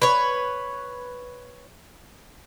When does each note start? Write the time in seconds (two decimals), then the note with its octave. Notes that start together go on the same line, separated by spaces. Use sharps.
0.02 B4 C#5